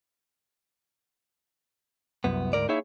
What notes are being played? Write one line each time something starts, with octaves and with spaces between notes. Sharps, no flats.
C2 F#2 B3
D2 G#2 A#4 D5
A#3 D#4 E4 G#4 C#5 E5